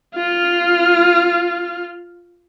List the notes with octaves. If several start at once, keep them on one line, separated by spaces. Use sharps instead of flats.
F4 F6